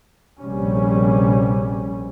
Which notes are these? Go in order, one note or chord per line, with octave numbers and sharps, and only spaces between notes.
A#1 C3 G3 C#4